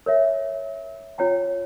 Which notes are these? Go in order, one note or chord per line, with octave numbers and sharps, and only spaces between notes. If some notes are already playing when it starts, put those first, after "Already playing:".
A#4 C#5 E5
F4 C#5 G5 A#5